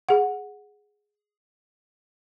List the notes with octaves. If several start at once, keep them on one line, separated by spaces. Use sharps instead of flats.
G#4 F#5